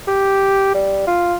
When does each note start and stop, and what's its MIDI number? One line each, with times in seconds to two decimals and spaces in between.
0.07 0.71 67
0.74 1.04 55
1.07 1.37 65